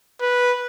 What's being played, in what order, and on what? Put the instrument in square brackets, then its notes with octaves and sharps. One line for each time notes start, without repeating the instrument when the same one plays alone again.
[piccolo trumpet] B4